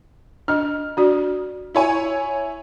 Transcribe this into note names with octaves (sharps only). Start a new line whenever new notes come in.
D4 D#5 F6
D4 F#4 D5
E4 C#5 G#5